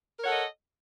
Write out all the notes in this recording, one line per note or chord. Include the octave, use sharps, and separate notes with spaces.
A4 A#4 C#5 D#5 F#5